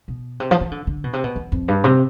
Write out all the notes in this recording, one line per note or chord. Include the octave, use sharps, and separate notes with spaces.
B2
C3
F3
E3
D3
D3
B2
C3
B2
E2
F2
G2
C3